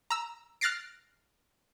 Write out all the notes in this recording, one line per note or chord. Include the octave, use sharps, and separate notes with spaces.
A#5 E6
F6 F#6 A6 A#6 C7 D7